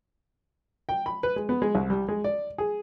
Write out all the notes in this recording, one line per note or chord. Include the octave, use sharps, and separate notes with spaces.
G5
B5
B4
G#3
B3
G#3
C2
G3
G#3
D5
G#4